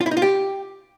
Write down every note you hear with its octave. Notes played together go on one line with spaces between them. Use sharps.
F4
E4
D#4
F4
G4